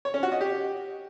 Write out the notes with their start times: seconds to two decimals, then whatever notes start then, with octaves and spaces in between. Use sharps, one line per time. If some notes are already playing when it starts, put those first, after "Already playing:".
0.05 C#5
0.14 C#4
0.23 F#4
0.32 D#5
0.41 G4